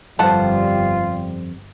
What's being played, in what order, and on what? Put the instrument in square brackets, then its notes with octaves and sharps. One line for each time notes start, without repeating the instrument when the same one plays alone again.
[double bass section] G1 G3 [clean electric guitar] F2 C5 [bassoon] F4 [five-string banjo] A4 F#5 A5